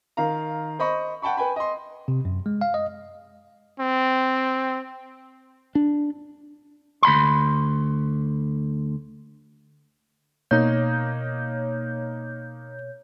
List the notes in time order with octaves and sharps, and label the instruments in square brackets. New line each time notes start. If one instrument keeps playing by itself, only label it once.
[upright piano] D#3 F5 A#5
C5 D#5 B5 C#6
F#5 G5 A5 B5 C#6
B4 G5 G#5 B5
D#5 C6
[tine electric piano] C3
F#2
G#3
F5
D#5
[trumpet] C4
[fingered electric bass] D4
[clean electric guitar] D2 B5 C6
[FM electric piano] B2 C#5 G6 [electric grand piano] A#3 D#4